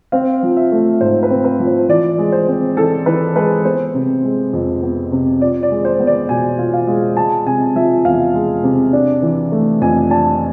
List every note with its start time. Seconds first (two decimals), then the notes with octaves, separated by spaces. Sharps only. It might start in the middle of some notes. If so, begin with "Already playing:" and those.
0.12 C4 F5
0.43 F3
0.57 E5
0.72 A3
1.01 G#2 C5
1.23 B4
1.30 C4
1.44 B4
1.59 F3
1.67 C5
1.89 E3 D5
2.18 G#3
2.32 C5
2.48 C4
2.77 E3 A4
3.06 E3 B4
3.36 G#3 B4
3.65 B3 C5
3.94 C3
4.23 G#3
4.53 F2
4.83 B3
5.12 C3
5.41 F4 D5
5.63 D5
5.71 G#3
5.85 C5
6.00 B3
6.07 D5
6.29 B2 G#5
6.58 F4
6.73 F5
6.87 G#3
7.17 G#3 A5
7.46 C3 G#5
7.75 F3 E5
8.05 E2 F5
8.34 G#3
8.64 C3
8.93 D4
9.22 E3
9.52 A3
9.81 F2 G#5
10.11 D4 A5